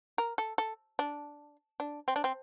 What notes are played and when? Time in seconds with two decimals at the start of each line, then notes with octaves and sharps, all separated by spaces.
0.18 A#4
0.38 A4
0.58 A4
0.99 D4
1.80 D4
2.08 C4
2.16 D4
2.24 C4